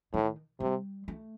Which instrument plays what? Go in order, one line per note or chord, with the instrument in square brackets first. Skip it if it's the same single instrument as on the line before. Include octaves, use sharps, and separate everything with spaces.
[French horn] A2 [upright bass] D#3
[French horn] C3 [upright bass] G3
[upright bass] A3